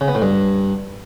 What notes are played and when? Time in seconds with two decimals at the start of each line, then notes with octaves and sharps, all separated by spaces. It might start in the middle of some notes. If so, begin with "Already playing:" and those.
0.01 C#3
0.08 B3
0.15 A2
0.22 G2